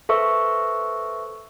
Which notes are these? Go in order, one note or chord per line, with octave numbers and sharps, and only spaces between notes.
A4 B4 C5 E5 C#6 E6